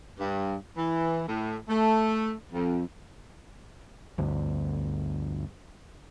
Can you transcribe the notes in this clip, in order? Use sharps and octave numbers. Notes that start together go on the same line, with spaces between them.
G2
E3
A2
A3
F2
G1 D2